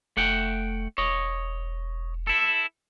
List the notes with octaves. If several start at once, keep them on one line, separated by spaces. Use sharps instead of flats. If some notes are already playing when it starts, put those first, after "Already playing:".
F1 A3 F#5 G5
E1 C#5 D#5
E4 A4